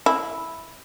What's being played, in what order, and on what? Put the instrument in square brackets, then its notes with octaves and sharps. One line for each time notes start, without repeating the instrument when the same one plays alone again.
[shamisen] E4